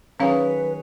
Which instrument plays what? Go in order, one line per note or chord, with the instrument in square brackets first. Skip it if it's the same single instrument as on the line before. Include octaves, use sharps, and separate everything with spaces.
[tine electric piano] D#3 F#3 [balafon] C#4 F5 [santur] G#4 C#5 [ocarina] B4